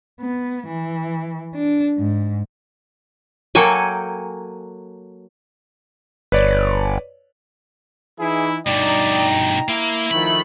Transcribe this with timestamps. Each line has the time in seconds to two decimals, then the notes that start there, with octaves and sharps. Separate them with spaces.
0.20 B3
0.68 E3
1.55 D4
1.98 G#2
3.55 F#3 A#3 A4 G5 G#5 C#6
6.32 G1 B4 C#5 D5
8.19 E3 D#4 E4 G#4
8.67 G2 B2 D#4 D5 G5 A#5
9.69 A#3 E4
10.11 D#3 F3 A3 B5